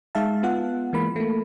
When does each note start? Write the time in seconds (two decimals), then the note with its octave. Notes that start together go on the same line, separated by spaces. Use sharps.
0.15 G#3 D#4 E5 F5 A5
0.43 B3 F4 F#5
0.93 E3 G#3 A#3 B5
1.16 A3 A#3